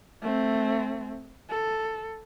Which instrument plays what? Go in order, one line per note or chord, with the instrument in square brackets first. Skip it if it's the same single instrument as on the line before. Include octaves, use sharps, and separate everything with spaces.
[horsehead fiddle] A3 C4
A4